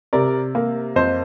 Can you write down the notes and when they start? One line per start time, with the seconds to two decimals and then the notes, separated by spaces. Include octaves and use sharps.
0.13 C3 A#4 D5
0.55 A#3
0.96 F2 C5 D#5